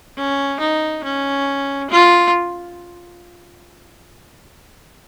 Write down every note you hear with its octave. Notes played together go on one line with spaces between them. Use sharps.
C#4
D#4
C#4
F4